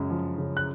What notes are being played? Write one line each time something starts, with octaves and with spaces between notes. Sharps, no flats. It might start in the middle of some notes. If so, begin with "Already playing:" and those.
Already playing: F#2 C#3 G#3
F3
C#3
F#6